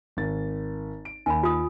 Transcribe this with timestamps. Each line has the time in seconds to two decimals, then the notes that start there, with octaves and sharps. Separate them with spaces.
0.17 G#1 A6
1.05 D7
1.26 D#2 G#5 B5
1.43 F4 D#6